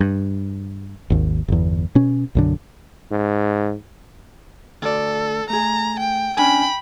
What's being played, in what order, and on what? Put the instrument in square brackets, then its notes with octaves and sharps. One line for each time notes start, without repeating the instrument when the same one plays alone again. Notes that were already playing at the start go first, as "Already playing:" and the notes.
[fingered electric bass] G2
G#1 D#2
G1 E2
B2 C#4
B1 F#2 D3
[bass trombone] G#2
[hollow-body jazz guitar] D2 D5 [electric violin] A4
[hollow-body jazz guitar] A3 G#4 [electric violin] A#5
[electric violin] G5
[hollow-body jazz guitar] C#4 D4 G#5 [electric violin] G5 B5